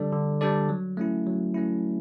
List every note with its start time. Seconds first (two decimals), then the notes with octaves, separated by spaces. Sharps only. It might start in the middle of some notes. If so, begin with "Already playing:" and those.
Already playing: D3 G3 D4 A4 D5
0.12 D3
0.41 G3 D4 A4 D5
0.69 F#3
0.97 A3 C#4 E4
1.27 F#3
1.54 A3 C#4 E4